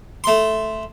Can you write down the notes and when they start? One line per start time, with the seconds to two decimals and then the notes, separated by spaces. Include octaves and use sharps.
0.24 A3 C6